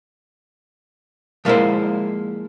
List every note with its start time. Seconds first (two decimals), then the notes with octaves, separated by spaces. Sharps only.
1.45 F3 G#3 A#3 E4 A#4 C5